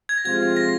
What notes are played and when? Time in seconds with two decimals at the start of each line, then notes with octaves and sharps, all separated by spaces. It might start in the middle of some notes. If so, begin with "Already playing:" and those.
0.09 G#6
0.18 A#6
0.25 C3 F3 G#3 C4 F4 G#6
0.57 A#6